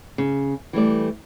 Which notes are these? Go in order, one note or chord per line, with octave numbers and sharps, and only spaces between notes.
C#3
E3 G3 A3 D5